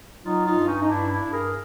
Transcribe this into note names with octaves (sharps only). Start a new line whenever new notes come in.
F#3 D#4 F4
D#4 F4
G2
C#4 D#4
D#4
G2 D4 E4
D4 E4
G2
G#4 A#4